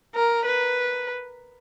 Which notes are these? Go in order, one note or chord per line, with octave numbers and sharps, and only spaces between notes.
A#4
B4